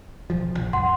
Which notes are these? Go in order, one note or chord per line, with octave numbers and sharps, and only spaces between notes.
E1 F3
A#1
C#2 F#2 F#5 C6